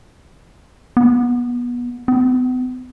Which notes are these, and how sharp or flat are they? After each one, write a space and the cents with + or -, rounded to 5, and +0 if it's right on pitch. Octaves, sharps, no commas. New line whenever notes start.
B3 -25
B3 +40